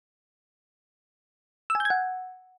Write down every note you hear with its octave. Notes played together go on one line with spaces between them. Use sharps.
E6
G#5
G6
G#6
F#5